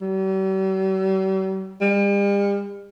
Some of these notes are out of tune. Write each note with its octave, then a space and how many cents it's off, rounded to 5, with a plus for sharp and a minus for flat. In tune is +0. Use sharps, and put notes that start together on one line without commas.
G3 -45
G3 +40